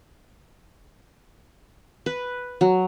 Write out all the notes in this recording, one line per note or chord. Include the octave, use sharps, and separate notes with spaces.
B4
F#3